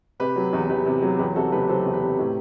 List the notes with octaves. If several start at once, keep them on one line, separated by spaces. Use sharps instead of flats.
C3 G4 B4
F#3
E2
E2 G4 B4
C3
F#3
E2 G4 B4
C3 F#4 A4
F#1 G4 B4
F#3 A4 C5
E2
G4 B4
C3
A2